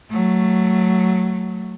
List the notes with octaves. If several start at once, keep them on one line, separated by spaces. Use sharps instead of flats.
F#3 A3